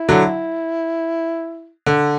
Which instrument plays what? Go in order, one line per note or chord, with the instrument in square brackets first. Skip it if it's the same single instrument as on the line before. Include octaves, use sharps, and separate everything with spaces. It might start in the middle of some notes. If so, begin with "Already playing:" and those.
Already playing: [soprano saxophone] E4
[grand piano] D3 F#3
D3